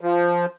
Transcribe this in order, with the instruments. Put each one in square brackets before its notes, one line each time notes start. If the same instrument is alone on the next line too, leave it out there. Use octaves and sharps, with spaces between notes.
[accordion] F3